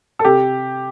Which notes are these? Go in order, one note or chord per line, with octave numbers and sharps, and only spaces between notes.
A4
C3 G4